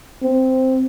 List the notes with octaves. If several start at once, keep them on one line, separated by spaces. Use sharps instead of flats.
C4